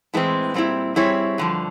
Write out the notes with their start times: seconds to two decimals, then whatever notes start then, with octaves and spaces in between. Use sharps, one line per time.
0.14 A2 E3 G#3 C4
0.54 A#2 G3 C4 E4
0.96 G3 C4 E4 G#4 C#5
1.38 G2 D3 F3